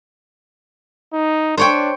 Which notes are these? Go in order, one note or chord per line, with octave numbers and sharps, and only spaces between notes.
D#4
D4 C5 C#5 G5